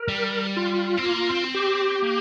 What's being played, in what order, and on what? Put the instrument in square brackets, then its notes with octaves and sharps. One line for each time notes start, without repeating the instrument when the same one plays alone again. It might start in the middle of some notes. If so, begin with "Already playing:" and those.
Already playing: [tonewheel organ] A#4
[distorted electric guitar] G3
[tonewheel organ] F4
[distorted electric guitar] C4
A#3
C4
[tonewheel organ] G4
[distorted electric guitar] A#3